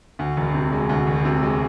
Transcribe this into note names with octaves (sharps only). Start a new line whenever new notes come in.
D2
E1
C3
G#3
D2
E1
C3
G#3